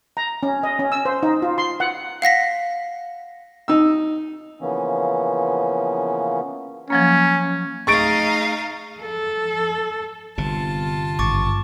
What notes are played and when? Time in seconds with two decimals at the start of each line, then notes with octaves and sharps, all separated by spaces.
0.17 A#5
0.43 C#4
0.63 D#5
0.79 C#4
0.92 E6
1.05 C5
1.23 D#4
1.42 F4
1.58 C6
1.80 F#5
2.22 F5 F#5 A#6 B6
3.68 D#4 E6
4.61 C#3 E3 F3 A#3 B3 C#4
6.90 F3 F#3 A#3 C#4
7.87 A3 D#4 G#4 F5 C#6 A6 D7
9.01 A4
10.38 G1 C3 F4 A5
11.19 G#1 G2 C#6 D6 A6